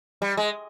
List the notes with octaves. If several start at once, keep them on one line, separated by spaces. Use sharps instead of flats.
G3
G#3